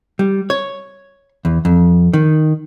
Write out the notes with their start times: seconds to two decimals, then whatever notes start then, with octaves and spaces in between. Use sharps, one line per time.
0.19 G3
0.50 C#5
1.45 E2
1.65 F2
2.13 D#3